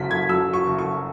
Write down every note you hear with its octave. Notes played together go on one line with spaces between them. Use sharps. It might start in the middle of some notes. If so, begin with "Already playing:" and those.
Already playing: F#1 F#3 B6
F#1 G#6
F#2 E6
F#3
C#6
F#1
C#6
F#1